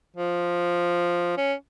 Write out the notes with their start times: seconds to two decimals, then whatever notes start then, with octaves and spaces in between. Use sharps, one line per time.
0.17 F3
1.37 C#4